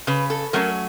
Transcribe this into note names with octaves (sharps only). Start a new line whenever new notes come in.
C#3 B4
A4
F#3 A3 C#4 A#4